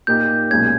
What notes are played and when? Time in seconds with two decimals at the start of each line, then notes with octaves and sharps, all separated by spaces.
0.07 A#2 A#3 D#4 G4 G6
0.50 B1 A#2 G#3 C#4 G#6